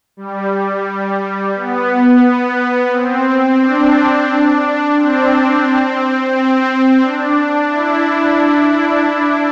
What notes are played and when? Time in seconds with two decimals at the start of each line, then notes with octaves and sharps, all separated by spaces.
0.17 G3
1.55 B3
2.92 C4
3.60 D4
4.96 C4
6.33 C4
7.02 D4
7.70 E4